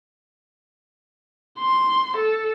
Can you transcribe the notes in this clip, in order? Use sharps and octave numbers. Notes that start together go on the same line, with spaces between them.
C6
A4